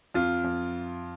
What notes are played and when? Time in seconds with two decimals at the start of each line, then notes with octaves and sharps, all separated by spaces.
0.14 F2 F4
0.44 F2